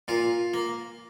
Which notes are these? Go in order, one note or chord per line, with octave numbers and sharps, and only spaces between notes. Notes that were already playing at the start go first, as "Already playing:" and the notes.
A#2 F4
A#3